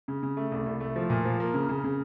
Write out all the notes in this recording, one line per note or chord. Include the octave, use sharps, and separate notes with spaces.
C#3
C#3
A3
C2
C2
A3
F3
A#2
F3
A#3
C#3
C#3
C#3